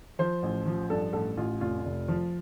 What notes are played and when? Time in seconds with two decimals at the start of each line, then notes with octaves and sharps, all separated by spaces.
0.19 F3 C5
0.43 A1
0.66 F3
0.90 G2 A4
1.13 A1 A4
1.37 A1 F4
1.61 F1 F4
1.85 F1
2.08 F3